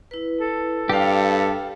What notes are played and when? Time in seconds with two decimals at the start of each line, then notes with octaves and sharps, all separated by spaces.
0.11 E4 B4
0.41 A4
0.89 G2 G4 B4 F5 G5